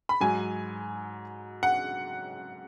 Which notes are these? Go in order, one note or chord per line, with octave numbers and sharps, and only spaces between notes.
B5
G#2 F#3 G#5
F#5